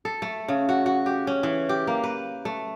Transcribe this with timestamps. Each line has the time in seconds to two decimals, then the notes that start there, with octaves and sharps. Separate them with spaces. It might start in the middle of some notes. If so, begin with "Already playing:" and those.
0.05 A4
0.22 A3
0.48 C#3
0.69 F#4
0.86 F#4
1.06 G4
1.27 C#4
1.43 E3
1.69 G4
1.87 A#3
2.04 B4
2.45 A3